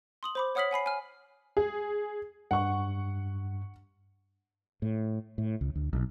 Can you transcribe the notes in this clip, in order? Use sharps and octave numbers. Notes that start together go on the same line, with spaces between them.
C6 D#6 F#7
C5 B5 D6
C#5 F#5 D#6 F6 B6 F#7
F#5 G#5 B5 C7
G#5 F6
G#4
G2 F#5 C#6
A2
A2
C#2
D2
B1